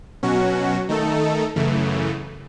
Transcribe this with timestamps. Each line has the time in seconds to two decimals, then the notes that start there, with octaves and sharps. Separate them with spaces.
0.23 B2 F#3 C#4 F#4
0.89 D#3 A3 D#4 A4
1.56 F#2 C#3 E3 A3